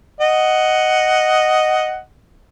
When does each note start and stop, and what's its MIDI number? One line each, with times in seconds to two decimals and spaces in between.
0.20 1.99 75
0.20 1.99 78